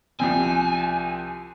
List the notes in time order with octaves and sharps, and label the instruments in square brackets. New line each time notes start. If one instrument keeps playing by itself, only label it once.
[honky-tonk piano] C2 F3 C4 [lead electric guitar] G#5